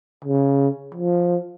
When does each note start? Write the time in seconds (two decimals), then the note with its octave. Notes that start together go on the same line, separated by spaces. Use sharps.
0.24 C#3
0.95 F3